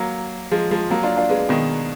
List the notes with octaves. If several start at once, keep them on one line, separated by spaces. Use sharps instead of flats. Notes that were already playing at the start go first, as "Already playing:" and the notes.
Already playing: F#3 A#3
F3 G#3
F3 G#3
F#3 A#3
D4 F4
D4 F4
G#3 B3
B2 D#3